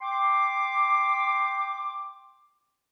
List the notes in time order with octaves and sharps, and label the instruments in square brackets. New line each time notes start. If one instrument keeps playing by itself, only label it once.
[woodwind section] G5 C6 D6